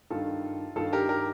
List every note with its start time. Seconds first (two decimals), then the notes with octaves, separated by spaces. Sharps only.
0.10 G2 D#3 F4 A4
0.76 G2 D#3 F4 A4
0.93 G4 A#4
1.09 G4 A#4